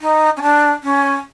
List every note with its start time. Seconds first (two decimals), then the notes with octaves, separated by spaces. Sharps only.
0.01 D#4
0.37 C#4
0.42 D4
0.84 C#4